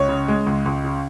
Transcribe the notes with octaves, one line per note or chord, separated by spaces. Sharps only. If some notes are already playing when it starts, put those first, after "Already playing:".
Already playing: C#2 C#5
C#3
G#3
C#2
C#2
C#3